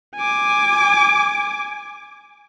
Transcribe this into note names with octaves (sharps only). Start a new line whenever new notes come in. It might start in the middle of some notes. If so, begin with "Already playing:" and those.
G#5 D6